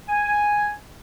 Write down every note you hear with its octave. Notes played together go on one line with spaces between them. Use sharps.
G#5